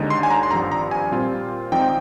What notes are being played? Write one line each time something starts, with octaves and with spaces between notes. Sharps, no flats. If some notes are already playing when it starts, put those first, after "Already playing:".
Already playing: D#2 D3 G#3 D#4
C6
G#5
A#5
C6
G#1 G2 F3 A#5
A#5
G#5
A#2 G3 C4 F4
G#1 G#2 F3 C4 D#4 G5